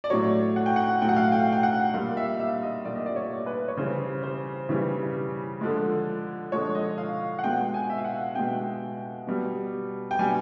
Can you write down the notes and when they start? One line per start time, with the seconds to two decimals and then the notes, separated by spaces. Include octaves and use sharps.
0.04 D5
0.10 A2 F#3 C#5
0.56 F#5
0.66 G5
0.76 F#5
1.02 A2 F#3 G5
1.09 F#5
1.16 F5
1.24 F#5
1.32 G5
1.52 G5
1.63 F#5
1.94 A#2 G3 F5
2.17 E5
2.36 F5
2.40 E5
2.63 D#5
2.85 A#2 G3 D5
2.95 D#5
3.06 D5
3.16 C#5
3.46 B4
3.68 C#5
3.77 C#3 E3 G3 C5
4.23 C5
4.69 C#3 E3 G3
5.61 D3 F3 G#3
6.52 D3 F3 G#3 C#5
6.75 D#5
6.98 F5
7.39 F#5
7.44 B2 G#3 G5
7.74 G#5
7.90 E5
7.98 F5
8.04 F#5
8.35 B2 G#3 G5
9.27 B2 G3
10.11 G5
10.19 B2 G3 G#5